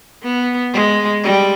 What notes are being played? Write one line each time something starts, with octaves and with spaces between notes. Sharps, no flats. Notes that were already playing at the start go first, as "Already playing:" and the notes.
B3
G#3
G3